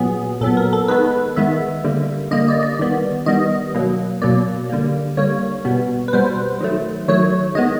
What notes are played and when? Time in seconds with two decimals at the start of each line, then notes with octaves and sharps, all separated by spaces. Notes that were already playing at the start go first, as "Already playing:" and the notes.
Already playing: A#2 F#3 B3 G#4
0.41 A#2 F#3 B3 A4
0.57 A#4
0.73 A4
0.88 D#3 G#3 B3 B4
1.36 D#3 G#3 B3 E5
1.84 D3 G3 A#3
2.31 D3 G3 A#3 D#5
2.48 D5
2.63 D5
2.79 D#3 G3 B3
3.26 D#3 G3 B3 D#5
3.75 B2 F#3 A#3
4.22 B2 F#3 A#3 D5
4.69 D3 G3 A#3
5.17 D3 G3 A#3 C#5
5.65 B2 G3 B3
6.08 B4
6.13 B2 G3 B3 C5
6.61 D#3 F#3 A3
7.08 D#3 F#3 A3 C#5
7.55 D#3 G#3 B3 D#5